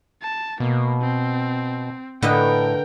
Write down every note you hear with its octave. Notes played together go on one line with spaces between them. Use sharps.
A5
B2 A#3
C4
A2 D3 A#4 B4 D#5 G5